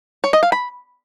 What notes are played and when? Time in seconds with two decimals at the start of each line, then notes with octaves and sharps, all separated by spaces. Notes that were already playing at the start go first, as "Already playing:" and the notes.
0.24 C#5
0.33 D#5
0.43 F5
0.52 B5